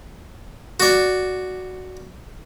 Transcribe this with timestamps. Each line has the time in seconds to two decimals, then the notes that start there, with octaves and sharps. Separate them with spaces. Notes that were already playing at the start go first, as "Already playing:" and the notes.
0.80 F#4 D5